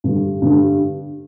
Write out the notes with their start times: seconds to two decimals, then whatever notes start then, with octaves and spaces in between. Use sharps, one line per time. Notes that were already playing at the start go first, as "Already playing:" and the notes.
0.04 G2 D3 G3
0.42 G2 D3 G3